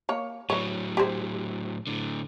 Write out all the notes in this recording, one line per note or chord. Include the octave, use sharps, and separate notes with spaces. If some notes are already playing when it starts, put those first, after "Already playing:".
A#3 C#5
A2 F#3 B4 C#5
G4 G#4 C5
A2 D3